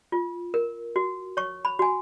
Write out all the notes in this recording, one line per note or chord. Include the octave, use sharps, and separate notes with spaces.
F4
A#4
F#4
C#5 C#6
B5
F#4 G#5